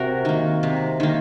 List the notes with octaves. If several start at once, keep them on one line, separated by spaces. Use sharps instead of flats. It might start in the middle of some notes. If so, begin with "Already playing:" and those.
Already playing: C3 F#4 A#4
D#3 A#3
C3
D#3 A#3